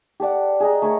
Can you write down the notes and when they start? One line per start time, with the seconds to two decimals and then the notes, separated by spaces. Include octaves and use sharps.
0.20 G4 A4 D5 F#5
0.60 G#4 D#5 A#5
0.82 A3 G#4 A#4 C#5